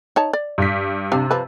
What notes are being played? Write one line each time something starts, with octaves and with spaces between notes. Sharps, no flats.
D#4 C#5 A5
D5
G2 B6
C3 G3 D4 F5
F3 B4